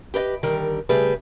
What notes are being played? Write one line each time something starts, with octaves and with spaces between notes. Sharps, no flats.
G4 B4 C5 D#5
D3 D#3 G3 A#4
C#3 G3 A3 G#4 B4